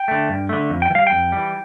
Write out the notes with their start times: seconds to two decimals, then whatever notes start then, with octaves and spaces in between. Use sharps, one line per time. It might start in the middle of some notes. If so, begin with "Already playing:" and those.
Already playing: G5
0.08 D3 A3
0.29 G2
0.49 D3 A3
0.70 F2
0.82 G5
0.90 E3
0.95 G3 F5
1.07 F2 G5
1.32 E3 G3